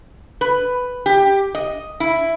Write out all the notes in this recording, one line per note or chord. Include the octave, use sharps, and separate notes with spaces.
B4
G4
D#5
E4